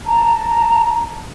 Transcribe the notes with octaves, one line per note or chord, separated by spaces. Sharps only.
A5 A#5